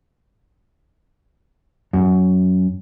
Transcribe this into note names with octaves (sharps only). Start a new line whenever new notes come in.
F#2